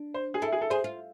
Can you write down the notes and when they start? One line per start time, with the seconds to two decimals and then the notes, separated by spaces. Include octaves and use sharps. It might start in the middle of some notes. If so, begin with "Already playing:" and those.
Already playing: D4
0.14 C5
0.34 G#4
0.42 E4 A4
0.52 G#4
0.61 A4
0.70 G#4 C5
0.84 F4